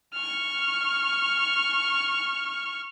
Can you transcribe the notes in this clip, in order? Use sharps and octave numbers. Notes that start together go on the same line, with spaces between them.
C#6 F6